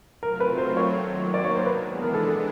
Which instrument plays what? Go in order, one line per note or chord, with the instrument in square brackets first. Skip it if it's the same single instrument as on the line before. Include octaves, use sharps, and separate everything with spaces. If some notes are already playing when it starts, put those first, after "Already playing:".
[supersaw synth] F#3 A3 C4 F4 [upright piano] A#4
[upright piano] B4
C5
C#5
[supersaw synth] D#3 F#3 A#3
[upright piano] D5
C#5
C5
[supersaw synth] E3 G#3 B3 D4 [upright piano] B4
[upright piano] A#4
A4
A4